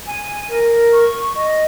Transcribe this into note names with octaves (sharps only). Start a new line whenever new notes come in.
G#5
A#4
C#6
D#5